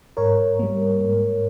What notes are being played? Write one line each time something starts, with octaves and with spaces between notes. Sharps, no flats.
G#2 A#4 C#5
G3 A#3
G#2